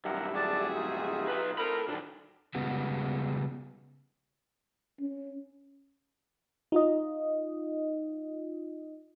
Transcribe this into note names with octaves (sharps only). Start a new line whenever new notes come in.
B1 G2 G4 A#4 E5 F#5
D4 F#4 G#4 D5 A5
D#4 F4
B1 B4
C4 A4 A#4 B5
A#2 D#3 F#3 D4
C#3 G3 G#3 B3 F#4
C#4
D#4 F4 D#5